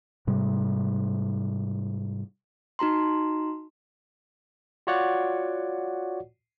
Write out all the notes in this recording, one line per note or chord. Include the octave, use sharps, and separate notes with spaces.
G#2 C3 G3
D#4 F#4 A#5 C6
F4 F#4 C#5 D5 F#5